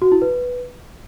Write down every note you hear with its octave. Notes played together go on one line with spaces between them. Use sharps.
F#4
E4
B4